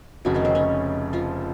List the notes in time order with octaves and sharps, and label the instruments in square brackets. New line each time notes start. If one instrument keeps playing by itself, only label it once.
[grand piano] F1 F2 C#3 [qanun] F#3 F#4
[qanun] D#3 D#4
C4
C#4
F3 F4